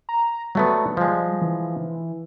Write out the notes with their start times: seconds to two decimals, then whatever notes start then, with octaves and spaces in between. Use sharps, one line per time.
0.09 A#5
0.55 F#3 G3 A3 B3
0.97 F3 G#3
1.42 E3